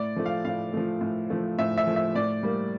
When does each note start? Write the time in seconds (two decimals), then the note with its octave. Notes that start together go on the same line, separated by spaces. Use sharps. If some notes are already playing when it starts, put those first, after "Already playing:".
Already playing: A2 D5
0.16 F3 A3
0.26 F5
0.45 A2 F5
0.73 F3 A3
1.01 A2
1.30 F3 A3
1.59 A2 E5
1.78 E5
1.87 F3 A3
1.96 E5
2.15 A2 D5
2.43 G3 A#3